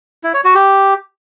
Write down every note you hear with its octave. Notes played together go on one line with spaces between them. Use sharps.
E4
C#5
F#4
G4